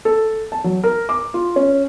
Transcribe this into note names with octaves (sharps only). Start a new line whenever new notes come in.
A4
A5
F#3
A#4
D6
F4
C#4